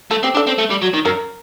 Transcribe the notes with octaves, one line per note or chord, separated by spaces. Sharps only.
A3 A4
C4 G4
D4 A4
C4
A3
G3
F#3
D#3
F#2 A#4